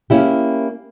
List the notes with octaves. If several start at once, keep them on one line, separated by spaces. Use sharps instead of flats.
A#3 C#4 E4 G4